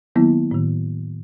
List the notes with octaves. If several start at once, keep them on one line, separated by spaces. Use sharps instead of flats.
D#3 F#3 A#3 B3 E4
A2 D#3